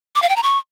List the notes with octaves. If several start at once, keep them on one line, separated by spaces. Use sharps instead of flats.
D6
F5
G5
A#5
C#6